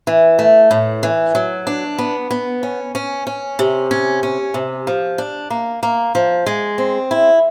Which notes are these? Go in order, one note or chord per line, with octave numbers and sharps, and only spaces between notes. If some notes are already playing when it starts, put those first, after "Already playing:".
E3
A3
A2
E3
F#3
D4
B3
B3
C#4
C#4
C#4
C3
C#4
C#4
C3
F3
D4
A#3
A#3
F3
G#3
C4
E4